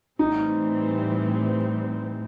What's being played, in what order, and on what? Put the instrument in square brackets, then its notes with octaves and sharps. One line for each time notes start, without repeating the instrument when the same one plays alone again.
[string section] A2 E3 G3 C4 [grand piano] D#4